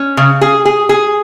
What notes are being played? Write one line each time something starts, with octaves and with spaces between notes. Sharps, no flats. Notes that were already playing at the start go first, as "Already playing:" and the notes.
Already playing: C#4
C#3
G#4
G#4
G#4